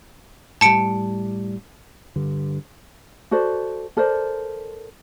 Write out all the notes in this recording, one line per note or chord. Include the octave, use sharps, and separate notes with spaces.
A2 G3 A5 C#7 D7
G2 D3
F#4 A4 C5 D5
A4 A#4 C5 D5